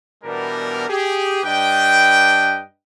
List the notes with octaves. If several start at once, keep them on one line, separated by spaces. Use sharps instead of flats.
B2 E3 G3 B3 D4 A#4
G4 G#4
G2 D4 B4 D#5 G5